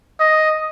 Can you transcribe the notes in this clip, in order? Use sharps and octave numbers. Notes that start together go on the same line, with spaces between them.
D#5